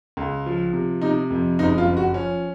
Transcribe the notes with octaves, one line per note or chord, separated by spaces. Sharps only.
C#2
F3
C3
C3 D#4
F2
F#1 D#4
F4
F#1
F#4
F3 C#4